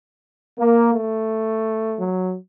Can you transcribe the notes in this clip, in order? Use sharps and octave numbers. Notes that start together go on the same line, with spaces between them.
A#3
A3
F#3